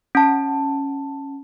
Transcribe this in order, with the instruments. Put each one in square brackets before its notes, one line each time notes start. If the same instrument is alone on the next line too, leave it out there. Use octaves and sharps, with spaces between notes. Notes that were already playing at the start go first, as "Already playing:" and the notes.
[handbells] C#4 A5